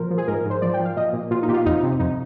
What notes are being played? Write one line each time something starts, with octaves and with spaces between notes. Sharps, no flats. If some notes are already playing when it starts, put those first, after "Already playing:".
Already playing: A#2 F3 A#4 C5
F3
G#4
G#2 A#4
G#2 C5
F3 D5
G5
F3
F5
A#2 D#5
A#2
A#2 F4
D#4
A#2 G4
F4
F2 D#4
C3
F2 D#4